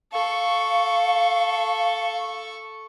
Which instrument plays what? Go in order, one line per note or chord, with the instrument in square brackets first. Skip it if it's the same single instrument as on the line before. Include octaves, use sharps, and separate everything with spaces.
[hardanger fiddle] A4 C#6 [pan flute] F5